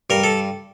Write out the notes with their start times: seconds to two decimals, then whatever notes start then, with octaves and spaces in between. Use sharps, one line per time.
0.10 G2 A#4
0.24 A4